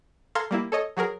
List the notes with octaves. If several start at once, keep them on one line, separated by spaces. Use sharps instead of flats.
A4 F5 A#5 C6 F6 G#6
G3 A#3 E4
A4 C#5 D#5
F#3 F#4 G#4 A#4